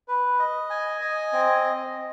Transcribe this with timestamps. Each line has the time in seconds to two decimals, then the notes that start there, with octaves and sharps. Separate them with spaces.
0.08 B4
0.39 D#5
0.70 G#5
1.01 D#5
1.33 C4